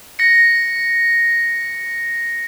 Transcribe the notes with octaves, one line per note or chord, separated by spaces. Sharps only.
A#6 C#7